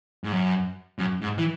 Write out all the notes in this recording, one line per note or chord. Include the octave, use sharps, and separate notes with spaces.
G#2
F#2
F#2
G#2
E3